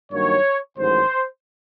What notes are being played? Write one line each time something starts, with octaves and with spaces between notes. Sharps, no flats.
G2 D#3 F#3 A#3 C#5
A1 G#2 D#3 F#3 C5